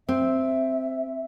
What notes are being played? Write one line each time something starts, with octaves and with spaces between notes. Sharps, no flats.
C4 E5